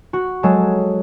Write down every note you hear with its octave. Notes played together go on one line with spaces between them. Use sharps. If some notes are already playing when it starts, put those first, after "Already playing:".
F#4
F#3 G#3 A4